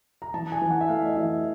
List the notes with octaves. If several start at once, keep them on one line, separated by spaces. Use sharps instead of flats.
A#5
E3 A5
G#5
E3
F#5
E5
A3 F5
D#5
E3 E5